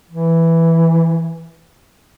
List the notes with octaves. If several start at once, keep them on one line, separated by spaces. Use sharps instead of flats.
E3